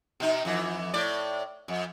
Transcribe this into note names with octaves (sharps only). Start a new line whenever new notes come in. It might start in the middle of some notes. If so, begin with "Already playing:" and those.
B2 D#4
F2 E3
A2 D5
F2